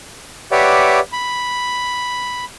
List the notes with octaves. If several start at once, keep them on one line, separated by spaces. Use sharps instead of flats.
G4 B4 C#5 D5 E5 F#5
B5